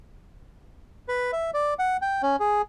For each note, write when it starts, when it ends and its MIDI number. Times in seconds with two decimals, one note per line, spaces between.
1.08 1.31 71
1.33 1.51 76
1.54 1.74 74
1.79 1.97 78
2.02 2.22 79
2.23 2.36 61
2.40 2.62 68